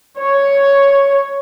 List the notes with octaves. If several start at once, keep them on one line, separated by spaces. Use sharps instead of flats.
C#5